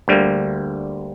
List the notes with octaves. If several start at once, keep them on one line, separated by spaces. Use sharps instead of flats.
D2 D3 G3 A#3